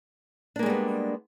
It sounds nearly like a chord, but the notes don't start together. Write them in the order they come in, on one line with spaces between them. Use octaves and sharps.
D4 A#3 G#3 G3 B3